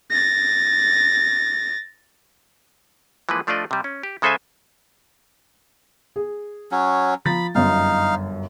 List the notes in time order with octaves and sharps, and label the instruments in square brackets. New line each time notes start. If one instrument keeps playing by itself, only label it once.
[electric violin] A6 A#6
[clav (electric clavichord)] E3 F3 G#3 A#3 B4
F3 A3 D4 F4 D5 D#5
C3 G3
C#4
G4
C#3 G#3 A4 C5 E5 G#5
[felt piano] G#4
[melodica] F#3 C#4
[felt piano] F3 A#5 A6 [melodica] B5
[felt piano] G1 F#2 [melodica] D#4 F5